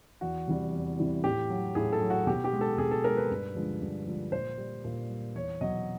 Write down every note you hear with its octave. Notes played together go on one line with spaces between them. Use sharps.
E2 F#4
C3 E3 G3
E2
C3 E3 G3
A2 G4
F#3
A2 G#4
A4
F#3
F#4
B2 G4
G4
G#3
A4
B2 G#4
A4
G#3 A#4
B4
G2
D3 F3 G#3
G2
D3 F3 G#3
A#2 C5
G3
A#2
G3
E2 C#5
B2 F#3 D#5